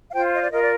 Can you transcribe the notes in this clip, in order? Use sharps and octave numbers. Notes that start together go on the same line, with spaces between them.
F5
F4 C5 G5
D#5
D5
F4 A#4 D#5
D5